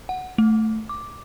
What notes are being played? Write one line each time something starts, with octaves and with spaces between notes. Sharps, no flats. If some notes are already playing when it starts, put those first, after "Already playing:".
F#5
A3
D6